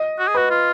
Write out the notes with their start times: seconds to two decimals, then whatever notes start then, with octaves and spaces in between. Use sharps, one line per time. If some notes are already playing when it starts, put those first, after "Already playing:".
Already playing: D#5
0.19 F#4
0.28 G#4
0.35 F#4 B4
0.50 F4